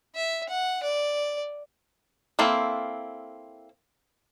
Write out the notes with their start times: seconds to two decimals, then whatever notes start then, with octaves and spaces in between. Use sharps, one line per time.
0.15 E5
0.49 F#5
0.83 D5
2.39 A#3 C4 E4 A4